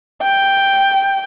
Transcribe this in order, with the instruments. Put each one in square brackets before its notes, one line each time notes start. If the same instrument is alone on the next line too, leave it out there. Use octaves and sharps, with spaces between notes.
[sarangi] G5